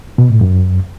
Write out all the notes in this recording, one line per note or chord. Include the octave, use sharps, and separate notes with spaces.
B2
A2
F#2